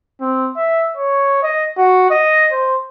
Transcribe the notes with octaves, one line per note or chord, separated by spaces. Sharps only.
C4
E5
C#5
D#5
F#4
D#5
C5